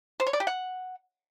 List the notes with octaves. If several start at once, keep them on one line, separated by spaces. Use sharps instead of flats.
C5
C#5
D5
G4
F#5